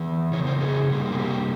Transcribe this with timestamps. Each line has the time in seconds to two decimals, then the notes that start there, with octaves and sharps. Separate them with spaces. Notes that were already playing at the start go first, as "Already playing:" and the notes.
Already playing: E2 E3
0.33 F2 C#3 C#5
0.47 C5
0.61 G#4
0.90 C3 G3 A#3
1.12 G#4
1.19 G4